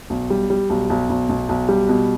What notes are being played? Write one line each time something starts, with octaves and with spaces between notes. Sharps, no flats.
B1
G3
G3
B1
B1
B1
B1
B1
G3
B2